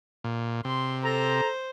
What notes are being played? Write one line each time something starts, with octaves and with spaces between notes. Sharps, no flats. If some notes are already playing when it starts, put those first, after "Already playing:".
A#2
C3 C6
A4 C5 A#5